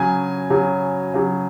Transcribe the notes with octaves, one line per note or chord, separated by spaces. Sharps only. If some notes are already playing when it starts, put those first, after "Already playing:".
Already playing: C#3 F#3 G#5
C#3 F#3
C#3 F#3